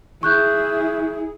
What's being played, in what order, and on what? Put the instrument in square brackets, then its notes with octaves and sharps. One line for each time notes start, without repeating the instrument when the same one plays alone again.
[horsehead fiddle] E4 G#4 [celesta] C#6 F#6 G6